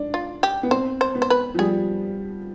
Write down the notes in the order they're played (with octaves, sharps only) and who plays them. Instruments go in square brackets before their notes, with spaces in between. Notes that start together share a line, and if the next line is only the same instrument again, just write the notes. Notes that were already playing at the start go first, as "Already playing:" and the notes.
Already playing: [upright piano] D4
[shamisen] F4
G4
[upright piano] B3
[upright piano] C4 [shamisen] C5
[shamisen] C5
[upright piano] B3
[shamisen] C5
B4
[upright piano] F3
[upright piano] G3 [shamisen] G#4